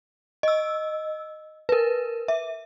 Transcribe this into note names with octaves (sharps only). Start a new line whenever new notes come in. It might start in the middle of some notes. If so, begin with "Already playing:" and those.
D#5 E6
A#4 B4
E5